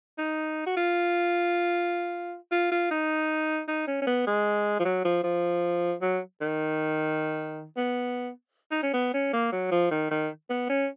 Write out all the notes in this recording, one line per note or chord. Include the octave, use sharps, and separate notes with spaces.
D#4
F#4
F4
F4
F4
D#4
D#4
C#4
C#4
B3
G#3
F3
F#3
F3
F3
F#3
D#3
B3
D#4
C#4
B3
C#4
A#3
F#3
F3
D#3
D#3
B3
C#4